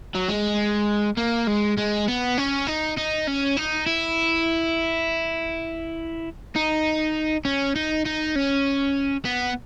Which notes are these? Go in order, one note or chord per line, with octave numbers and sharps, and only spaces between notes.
F#3
G#3
A#3
G#3
G#3
B3
C#4
D#4
D#4
C#4
D#4
E4
D#4
C#4
D#4
D#4
C#4
B3